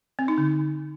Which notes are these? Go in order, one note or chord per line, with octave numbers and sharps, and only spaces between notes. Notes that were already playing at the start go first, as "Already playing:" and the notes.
C4
D#4
D3